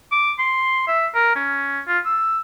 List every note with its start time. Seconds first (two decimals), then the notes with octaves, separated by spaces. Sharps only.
0.11 D6
0.39 C6
0.88 E5
1.15 A#4
1.35 C#4
1.88 F4
2.05 E6